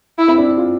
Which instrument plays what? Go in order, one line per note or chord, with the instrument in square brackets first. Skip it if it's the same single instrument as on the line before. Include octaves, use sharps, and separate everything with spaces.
[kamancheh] E4
[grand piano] C4
D4
E4
F4